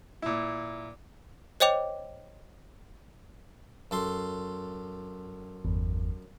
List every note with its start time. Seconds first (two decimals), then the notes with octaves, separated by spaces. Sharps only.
0.22 A#2 E4
1.60 C5 C#5 D#5 G5 D6 F7
3.91 F#2 A4 C6
5.65 G1 E2